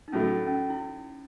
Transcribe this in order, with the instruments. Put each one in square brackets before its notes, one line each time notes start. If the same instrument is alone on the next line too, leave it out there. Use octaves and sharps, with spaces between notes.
[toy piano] D#4
[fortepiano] A2 F#3 A3 [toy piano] C#4
[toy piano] C#4
E4